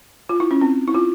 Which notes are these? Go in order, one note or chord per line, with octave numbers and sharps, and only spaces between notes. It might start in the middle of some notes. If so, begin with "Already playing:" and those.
F4
E4
C#4
C4
E4
F4